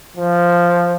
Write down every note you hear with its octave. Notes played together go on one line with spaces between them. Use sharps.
F3